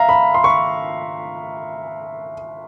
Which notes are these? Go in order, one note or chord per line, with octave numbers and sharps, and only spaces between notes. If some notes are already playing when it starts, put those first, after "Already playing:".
Already playing: E5 F5 A#5
B5
C6
C#6